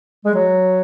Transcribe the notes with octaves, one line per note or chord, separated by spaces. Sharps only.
G#3
F#3